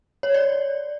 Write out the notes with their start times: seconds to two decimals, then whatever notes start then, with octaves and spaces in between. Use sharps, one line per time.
0.23 C#5
0.34 D5